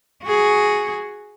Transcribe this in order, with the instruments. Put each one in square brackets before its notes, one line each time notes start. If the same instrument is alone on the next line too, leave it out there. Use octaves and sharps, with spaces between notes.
[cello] F#4 G#4